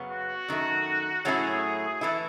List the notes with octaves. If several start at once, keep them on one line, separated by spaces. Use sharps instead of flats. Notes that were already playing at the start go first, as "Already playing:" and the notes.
Already playing: F#2 C#3 B3
F#4
F#2 D#3 A3
A2 F#3 A3 C#4 E4 G#4
E3 A3 E4